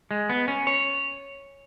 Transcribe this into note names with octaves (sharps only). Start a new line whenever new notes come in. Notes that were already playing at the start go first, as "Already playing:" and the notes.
G#3
B3
C#4
C#5